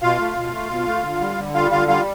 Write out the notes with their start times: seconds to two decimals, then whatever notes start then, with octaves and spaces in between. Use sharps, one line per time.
0.02 B2 F4 F5
0.19 A3
0.36 B2
0.53 A3
0.70 B2
0.87 A3
1.04 D3
1.21 G3
1.38 D3
1.55 G3 F4 F5
1.71 D3 F4 F5
1.88 G3 F4 F5